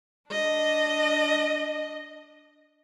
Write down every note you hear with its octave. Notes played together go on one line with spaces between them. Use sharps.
D4 D#5